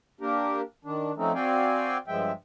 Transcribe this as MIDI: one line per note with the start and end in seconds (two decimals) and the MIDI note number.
0.21 0.61 58
0.21 0.61 62
0.21 0.61 67
0.21 0.61 70
0.85 1.12 51
0.85 1.12 62
1.17 1.32 53
1.17 1.32 57
1.17 1.32 60
1.17 1.32 61
1.17 1.32 63
1.35 1.97 60
1.35 1.97 66
1.35 1.97 74
1.35 1.97 77
1.35 1.97 79
1.35 1.97 80
2.08 2.32 43
2.08 2.32 53
2.08 2.32 56
2.08 2.32 76
2.08 2.32 79